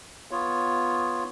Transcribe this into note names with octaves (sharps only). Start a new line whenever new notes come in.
B3 F4 C#5